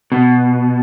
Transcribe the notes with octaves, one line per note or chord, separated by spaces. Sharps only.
B2